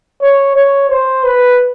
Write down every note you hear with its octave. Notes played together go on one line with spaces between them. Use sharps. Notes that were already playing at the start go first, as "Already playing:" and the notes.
C#5
C#5
C5
B4